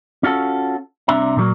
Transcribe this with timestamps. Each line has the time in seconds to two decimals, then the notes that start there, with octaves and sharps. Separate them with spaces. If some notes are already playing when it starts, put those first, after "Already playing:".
0.23 C#4 F4 F#4 A4
1.08 C2 C3 D4 E5 A#5
1.37 A#2 D3 F#3 A#3